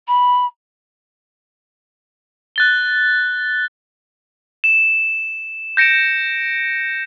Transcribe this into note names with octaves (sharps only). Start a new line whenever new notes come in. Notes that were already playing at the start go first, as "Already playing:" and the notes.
B5
F#6 A6 G7
E7
G6 A#6 C#7 D7 E7